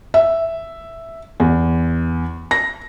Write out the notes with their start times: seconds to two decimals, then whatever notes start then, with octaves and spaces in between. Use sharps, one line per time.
0.14 E5
1.40 E2
2.51 A#6